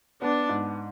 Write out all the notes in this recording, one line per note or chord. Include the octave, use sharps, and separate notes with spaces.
B3 D4
G#2